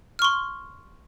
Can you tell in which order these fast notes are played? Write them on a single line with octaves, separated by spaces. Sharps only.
F6 C#6 C6